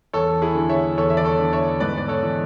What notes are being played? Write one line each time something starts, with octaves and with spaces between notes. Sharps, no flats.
E2 A4 C#5
E4 G#4
D3
C#5 E5
E2 A4 C#5
E5
D5
A4 C#5
D3
C#5 E5
G#2 B4 D5
D5
A4 C#5
E3